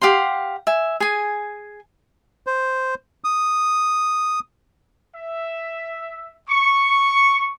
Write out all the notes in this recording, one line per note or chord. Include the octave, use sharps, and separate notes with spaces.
G4 F5 F#5 C6
E5 G#5
G#4 G#5
C5
D#6
E5
C#6